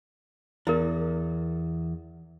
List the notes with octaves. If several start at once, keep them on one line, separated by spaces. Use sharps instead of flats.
E2 E4 A#4